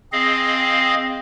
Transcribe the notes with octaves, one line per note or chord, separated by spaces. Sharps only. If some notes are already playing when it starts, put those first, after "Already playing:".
C4 G#4 D#5 F5